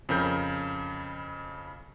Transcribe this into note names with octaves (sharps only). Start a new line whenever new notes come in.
F2 C#3 A#4 G6